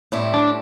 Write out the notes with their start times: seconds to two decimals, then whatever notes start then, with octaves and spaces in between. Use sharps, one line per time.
0.12 A2 G3 C4 E4
0.34 D4